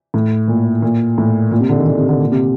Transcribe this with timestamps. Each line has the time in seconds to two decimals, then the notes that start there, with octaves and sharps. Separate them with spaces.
0.14 A2
0.48 A#2
0.82 A#2
1.18 A2
1.51 A#2
1.60 C3
1.69 D3
1.78 D#3
1.86 D3
1.98 C3
2.09 D3
2.20 A#2
2.32 C3